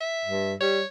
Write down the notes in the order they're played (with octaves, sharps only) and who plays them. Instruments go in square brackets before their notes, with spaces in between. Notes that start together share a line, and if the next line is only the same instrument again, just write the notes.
[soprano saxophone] E5
[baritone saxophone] G2
[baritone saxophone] G3 [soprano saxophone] C#5